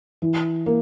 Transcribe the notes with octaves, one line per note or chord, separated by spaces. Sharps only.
E3
A#3